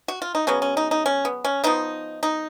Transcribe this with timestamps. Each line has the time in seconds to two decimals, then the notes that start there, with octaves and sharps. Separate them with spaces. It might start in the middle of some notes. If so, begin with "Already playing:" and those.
0.08 F#4
0.22 F4
0.35 D#4
0.47 C#3 F#3 B3 C#4
0.62 C#4
0.77 D#4
0.91 D#4
1.06 C#4
1.25 B3
1.44 C#4
1.64 F3 B3 D#4
2.23 D#4